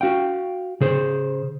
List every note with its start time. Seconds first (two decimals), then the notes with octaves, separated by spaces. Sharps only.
0.01 F#4 F5 G5
0.81 C#3 G#4 C5